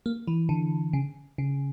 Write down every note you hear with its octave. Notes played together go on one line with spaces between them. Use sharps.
A#3
E3
D3
C#3
C#3